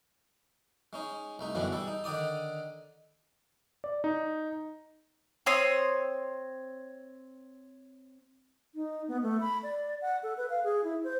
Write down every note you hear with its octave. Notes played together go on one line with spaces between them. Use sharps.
G#3 C#4 D#4
C2 A3 D#4
F#2 B2 D3 E3 G3 G#3
G3 G#3 A4
D#4
D3 D#3 D#4 D5 D#6
D5
D#4
C4 C#5 C6 D#6
D#4
B3
A3
B5
D5
F#5
A4
B4
F5
G#4
E4
C5